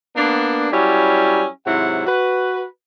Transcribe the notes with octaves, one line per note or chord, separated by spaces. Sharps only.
A#3 B3 D4
F#3 G3 C#4 E4 G4
G#2 C3 F#3 E4 F#5
F#4 B4